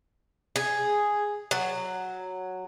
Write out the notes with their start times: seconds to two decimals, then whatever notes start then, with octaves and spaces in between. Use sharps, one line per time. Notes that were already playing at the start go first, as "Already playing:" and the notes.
0.56 G#4
1.51 F#3